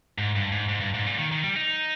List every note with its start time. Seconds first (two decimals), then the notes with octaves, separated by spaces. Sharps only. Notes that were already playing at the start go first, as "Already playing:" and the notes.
0.18 G#2
0.36 G2
0.52 G#2
0.69 G#2
0.81 G2
0.94 G#2
1.06 A#2
1.18 D#3
1.32 D#3
1.44 G3
1.56 D#4